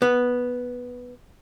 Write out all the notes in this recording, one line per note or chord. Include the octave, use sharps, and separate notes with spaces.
B3